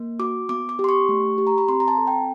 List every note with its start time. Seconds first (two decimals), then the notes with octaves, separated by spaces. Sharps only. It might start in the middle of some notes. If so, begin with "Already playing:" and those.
Already playing: A#3
0.19 F#4 D6
0.49 B3 D6
0.69 D6
0.79 G4
0.84 C6
0.89 C#6
1.09 A3
1.38 G4
1.47 A#5
1.58 B5
1.68 C4 C6
1.80 A#5
1.88 A5
1.98 A4
2.07 G5